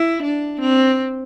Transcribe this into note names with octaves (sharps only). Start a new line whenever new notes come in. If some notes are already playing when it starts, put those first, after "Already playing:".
Already playing: E4
D4
C4